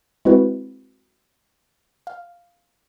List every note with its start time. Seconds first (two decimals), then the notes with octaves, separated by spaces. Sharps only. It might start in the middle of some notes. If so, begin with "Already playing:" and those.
0.25 G#3 C4 E4 F#4 B4
2.07 F5